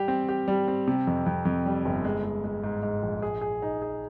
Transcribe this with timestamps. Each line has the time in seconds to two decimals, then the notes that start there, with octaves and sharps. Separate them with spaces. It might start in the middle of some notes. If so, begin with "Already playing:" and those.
Already playing: G3 G4
0.08 C4
0.29 G4
0.48 G3
0.68 C4
0.87 C3
1.07 F2
1.26 F2
1.45 F2
1.66 G3
1.85 G1
2.04 G#3
2.24 G#3
2.44 G#3
2.64 G#2
2.83 G#2
3.03 A#1
3.22 G#4
3.41 G#4
3.62 D#4
3.82 G#4